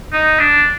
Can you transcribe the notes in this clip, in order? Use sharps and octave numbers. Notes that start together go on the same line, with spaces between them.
D#4
D4